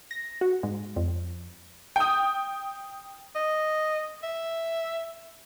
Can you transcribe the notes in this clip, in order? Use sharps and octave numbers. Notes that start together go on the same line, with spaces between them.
A#6
F#4
G#2
F2
G5 D#6
D#5
E5